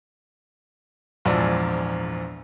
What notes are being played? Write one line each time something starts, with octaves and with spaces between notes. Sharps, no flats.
A#1 E2 G#2 F3 D5